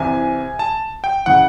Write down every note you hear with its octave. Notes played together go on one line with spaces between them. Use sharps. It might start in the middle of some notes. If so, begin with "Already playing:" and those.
Already playing: C2 C3 E3 G#5
A5
G5
C#3 E3 F#5